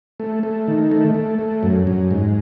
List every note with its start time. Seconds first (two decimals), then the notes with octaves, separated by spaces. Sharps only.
0.20 A3
0.43 A3
0.68 D#3
0.91 A3
1.15 A3
1.39 A3
1.63 F#2
1.87 F#2
2.11 G#2